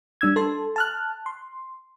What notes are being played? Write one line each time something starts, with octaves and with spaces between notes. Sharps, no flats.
G3 D4 E6 G#6
A4 A5 C6
A5 F6 F#6
C6